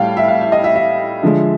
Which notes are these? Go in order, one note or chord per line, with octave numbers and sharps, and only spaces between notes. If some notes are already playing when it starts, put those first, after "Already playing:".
Already playing: A2 G3 F5 G5 A5
E5
F5
E5
D#5
E5
E5
D3 F3 G#3